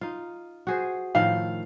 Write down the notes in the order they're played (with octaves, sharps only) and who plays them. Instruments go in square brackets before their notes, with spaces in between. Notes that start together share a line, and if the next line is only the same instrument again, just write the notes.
[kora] D#4 F4
F#4 G#4 C5
[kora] A2 D#3 F3 [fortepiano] F5